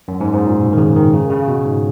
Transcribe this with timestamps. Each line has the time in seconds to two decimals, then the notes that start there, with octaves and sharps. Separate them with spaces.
0.08 F#2
0.21 G#2
0.34 G#2
0.46 A#2
0.60 B2
0.73 D#3
0.78 C#3
0.96 D#3
1.13 C#3
1.30 C#3
1.48 B2
1.65 G#2